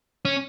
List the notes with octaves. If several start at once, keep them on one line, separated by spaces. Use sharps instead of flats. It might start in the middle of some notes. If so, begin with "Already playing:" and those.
C#4